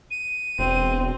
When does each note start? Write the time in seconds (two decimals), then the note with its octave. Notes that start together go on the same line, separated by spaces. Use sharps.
0.11 D#7
0.59 E1 C4